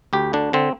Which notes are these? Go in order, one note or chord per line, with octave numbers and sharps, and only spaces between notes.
D2 G4
D3 D4
D3 C4